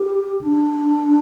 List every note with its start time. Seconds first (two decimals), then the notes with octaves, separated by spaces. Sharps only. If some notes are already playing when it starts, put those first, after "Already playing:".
Already playing: G4
0.41 D4